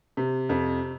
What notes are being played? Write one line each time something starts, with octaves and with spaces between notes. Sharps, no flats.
C3
F2